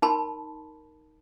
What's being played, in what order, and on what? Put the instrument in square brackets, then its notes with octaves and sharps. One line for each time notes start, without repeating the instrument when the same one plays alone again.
[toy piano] D#4 A#4 A5 B5 C6